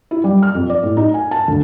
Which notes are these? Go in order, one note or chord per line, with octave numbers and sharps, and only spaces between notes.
E4
G3
F6
F2
D5
A2
D#4
G#5
A5
D2